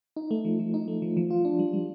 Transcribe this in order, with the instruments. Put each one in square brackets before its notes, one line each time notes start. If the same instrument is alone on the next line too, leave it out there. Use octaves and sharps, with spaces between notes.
[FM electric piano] D#4
A3
F3
F3
D#4
A3
F3
F3
F4
D4
G3
G3